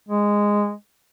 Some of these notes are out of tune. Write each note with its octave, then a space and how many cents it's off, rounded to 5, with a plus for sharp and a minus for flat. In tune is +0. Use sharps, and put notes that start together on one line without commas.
G#3 -10